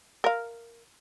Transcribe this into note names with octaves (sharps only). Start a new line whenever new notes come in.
A#4 F5